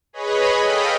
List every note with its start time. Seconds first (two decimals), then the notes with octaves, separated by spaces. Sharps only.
0.13 G#4 B4 C#5 D#5 B5
0.65 A4 D#5 F5 G5 B5